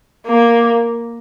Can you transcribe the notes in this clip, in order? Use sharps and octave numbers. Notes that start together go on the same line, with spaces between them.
A#3